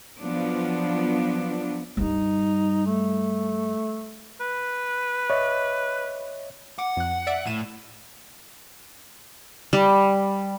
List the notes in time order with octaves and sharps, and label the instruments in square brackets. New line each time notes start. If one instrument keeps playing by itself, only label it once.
[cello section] F3 F#3 B3 D4
[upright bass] G2 G3 [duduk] D#4
[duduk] A3
[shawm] B4
[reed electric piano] C#5 D#5 E5
[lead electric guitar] F#5 [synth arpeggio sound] D6
[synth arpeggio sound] F2 F#6
D5 E5 D7
[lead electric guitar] A2 [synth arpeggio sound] D#7 E7
[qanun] G3